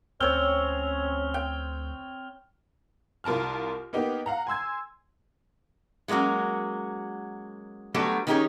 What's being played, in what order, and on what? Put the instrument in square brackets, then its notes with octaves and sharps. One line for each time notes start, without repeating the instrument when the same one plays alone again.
[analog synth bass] D2 [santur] C4 C#5 [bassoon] C#4 [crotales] F6 F7 G7
[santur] G5
[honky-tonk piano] C2 F4 A#4 A5 F6
A#3 B3 D#4 G4
F5 F#5 A#5
G#5 C6 E6 G#6
[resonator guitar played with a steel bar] F#3 G#3 A#3 C#4 F#4
F#3 G3 A3 B3 D4 F#4
D#3 C#4 D#4 G4 G#4 C#5